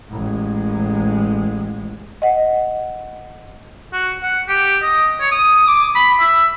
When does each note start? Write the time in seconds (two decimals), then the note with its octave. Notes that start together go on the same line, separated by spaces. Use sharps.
0.10 A1 G#3
2.22 D#5 F#5
3.93 F#4
4.22 F#5
4.48 G4
4.82 D#5
5.20 C#5
5.31 D#6
5.67 D6
5.95 B5
6.20 E5